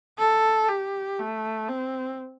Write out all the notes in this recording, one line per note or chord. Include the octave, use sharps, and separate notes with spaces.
A4
G4
A3
C4